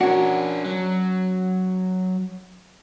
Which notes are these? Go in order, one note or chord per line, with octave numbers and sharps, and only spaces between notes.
C#4 D4 F#4 A#4
F#3